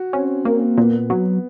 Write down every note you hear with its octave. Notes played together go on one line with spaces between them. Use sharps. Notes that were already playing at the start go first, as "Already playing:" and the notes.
Already playing: F#4
C4 C#4
A#3 C4
A#2 B3
F#3 B3